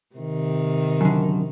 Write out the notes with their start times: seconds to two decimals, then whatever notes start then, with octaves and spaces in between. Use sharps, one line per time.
0.16 C3 D#3
1.01 F#2 D3